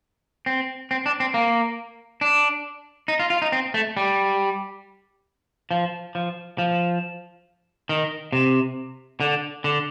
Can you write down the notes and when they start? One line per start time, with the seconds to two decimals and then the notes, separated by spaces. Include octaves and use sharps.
0.46 C4
0.91 C4
1.06 D4
1.20 C4
1.34 A#3
2.21 D4
3.08 D#4
3.20 F4
3.30 F4
3.42 D#4
3.52 C4
3.74 A3
3.97 G3
5.71 F3
6.15 F3
6.58 F3
7.89 D#3
8.32 C3
9.20 D3
9.64 D3